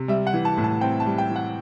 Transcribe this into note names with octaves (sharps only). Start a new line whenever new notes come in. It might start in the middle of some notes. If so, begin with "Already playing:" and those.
Already playing: C3
G3 E5
F#5
E3
A5
A2
A5
C4 G5
A5
G3
G5
E3
F#5